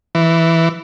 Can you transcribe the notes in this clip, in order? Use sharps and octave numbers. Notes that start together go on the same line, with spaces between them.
E3